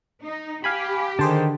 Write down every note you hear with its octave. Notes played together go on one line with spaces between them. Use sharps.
D#4
G4 F5 G#5 B5
D3 D#3 G#4 C5 A5